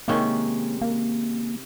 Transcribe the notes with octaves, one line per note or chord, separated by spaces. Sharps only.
C3 D#3 G#3 A#3 C#4
A#3